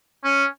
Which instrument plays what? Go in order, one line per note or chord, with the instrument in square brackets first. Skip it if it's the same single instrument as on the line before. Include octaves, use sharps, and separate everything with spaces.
[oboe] C#4